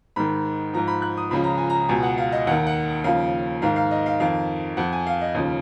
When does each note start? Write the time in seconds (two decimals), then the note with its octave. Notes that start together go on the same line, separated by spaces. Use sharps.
0.16 G#2 D#3 B5
0.74 G#2 F3 A#5
0.88 B5
1.02 F#6
1.17 D#6
1.31 C#2 C#3 F3 B5
1.44 A#5
1.58 G#5
1.70 A#5
1.89 C#2 B2 G#5
2.03 F#5
2.18 F5
2.32 D#5
2.47 D#2 D#3 F#5
2.67 F#5
3.04 D#2 C#3 F3 F5
3.62 G#2 D#3 F5
3.76 F5
3.91 D#5
4.06 F5
4.20 F2 D#3 F5
4.77 F2 F3 F#5
4.93 G#5
5.07 F5
5.21 D#5
5.35 D#2 C#3 F3 F5